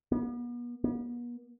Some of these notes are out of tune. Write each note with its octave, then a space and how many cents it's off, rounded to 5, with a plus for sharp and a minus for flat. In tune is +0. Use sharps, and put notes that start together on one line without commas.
B3 -40
B3 -40